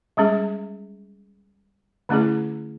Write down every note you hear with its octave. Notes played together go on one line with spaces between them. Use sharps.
G3 G#3 C#4 G#4
D3 A3 C#4 E4 G#4